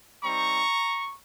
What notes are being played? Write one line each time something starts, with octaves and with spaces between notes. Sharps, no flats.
G3 C4 D#4 A#5 C#6